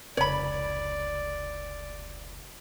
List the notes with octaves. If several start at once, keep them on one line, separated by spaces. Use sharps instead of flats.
F1 C#2 C#5 D5 B5